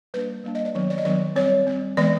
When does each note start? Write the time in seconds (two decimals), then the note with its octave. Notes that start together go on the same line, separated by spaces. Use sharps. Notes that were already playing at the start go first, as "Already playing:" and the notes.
0.14 G3 A#3 D4 B4
0.44 G3 A#3 D4
0.55 D#5
0.65 D5
0.75 D#3 F#3 B3 D4 C#5
0.90 D5
0.98 D#5
1.05 D#3 F#3 B3 D4 D5
1.36 G3 C4 C#5
1.67 G3 C4
1.97 E3 G#3 B3 D5